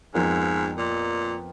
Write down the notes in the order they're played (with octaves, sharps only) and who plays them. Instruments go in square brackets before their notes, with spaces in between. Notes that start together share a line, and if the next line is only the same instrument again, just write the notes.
[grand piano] F2 F3 B3 F4 A#4 [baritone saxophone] G#2
[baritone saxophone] A#2